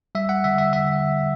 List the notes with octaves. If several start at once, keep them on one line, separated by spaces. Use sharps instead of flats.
G3 E5
F#5
D3 E5
E5
D3 E5